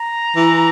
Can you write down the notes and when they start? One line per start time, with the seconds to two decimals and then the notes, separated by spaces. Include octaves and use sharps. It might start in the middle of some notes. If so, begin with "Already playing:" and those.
Already playing: A#5
0.36 E3